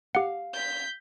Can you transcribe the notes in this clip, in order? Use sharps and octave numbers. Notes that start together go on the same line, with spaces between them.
G4 F5 F#5
G6 B6